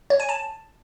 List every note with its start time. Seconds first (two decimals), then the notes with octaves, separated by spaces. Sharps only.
0.10 C#5
0.20 G#5
0.29 A5